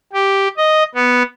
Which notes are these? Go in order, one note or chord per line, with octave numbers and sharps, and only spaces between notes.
G4
D#5
B3